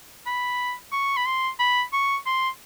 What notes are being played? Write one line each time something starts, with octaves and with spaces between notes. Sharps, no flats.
B5
C#6
B5
C6
B5
C#6
C6